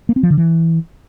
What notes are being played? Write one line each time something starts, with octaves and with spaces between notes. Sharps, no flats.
A#3
C4
F3
D3
E3